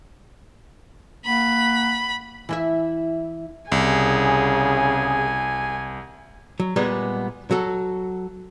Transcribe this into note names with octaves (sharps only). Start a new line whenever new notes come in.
A#3 F#5 B5
E3 E4 E5
C2 C#3 G#4 G#5
F#3
A#2 G3 G#3 B3 G#4
F#3 F#4 A4